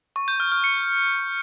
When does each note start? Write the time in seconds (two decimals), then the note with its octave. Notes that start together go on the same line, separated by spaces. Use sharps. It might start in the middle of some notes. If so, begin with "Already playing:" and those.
0.16 C#6
0.28 G6
0.40 F6
0.52 F6
0.64 C#7